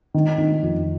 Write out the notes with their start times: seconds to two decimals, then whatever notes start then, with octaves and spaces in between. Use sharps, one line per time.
0.14 D#3
0.38 D#3
0.63 F2